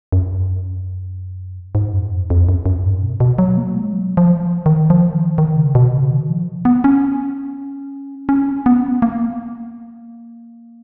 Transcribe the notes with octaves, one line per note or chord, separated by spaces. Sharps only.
F#2
G#2
F#2
F2
F2
F#2
F#2
G#2
B2
B2
F#3
A#3
G#3
F#3
F3
D#3
F3
D#3
D#3
C#3
B2
C#3
D#3
F3
B3
C#4
C#4
B3
A#3